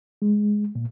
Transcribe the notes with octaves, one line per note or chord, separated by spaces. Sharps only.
G#3
A#2